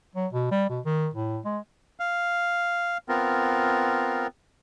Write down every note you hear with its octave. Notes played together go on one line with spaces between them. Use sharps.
F#3
B2
G3
B2
D#3
A2
G#3
F5
B3 C4 F4 A#4